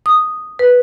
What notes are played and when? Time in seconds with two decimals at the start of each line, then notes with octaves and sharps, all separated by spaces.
0.06 D#6
0.59 B4